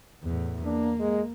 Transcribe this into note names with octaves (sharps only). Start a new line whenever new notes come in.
E2 A2
A#3 D4
G#3